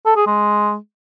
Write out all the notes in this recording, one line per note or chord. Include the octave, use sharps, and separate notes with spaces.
A4
G#4
G#3